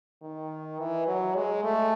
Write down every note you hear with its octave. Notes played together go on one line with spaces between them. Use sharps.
D#3
E3
F#3
G#3
A3